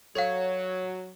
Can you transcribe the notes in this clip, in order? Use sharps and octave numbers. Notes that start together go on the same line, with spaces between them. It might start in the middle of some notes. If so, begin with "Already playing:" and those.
F#3 A4 C#5 F5